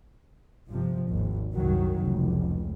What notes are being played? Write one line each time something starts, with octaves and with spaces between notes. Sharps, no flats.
G1 C3 F3
G#1 D#2
C2 F#2 D#3 F#3
F1 C#2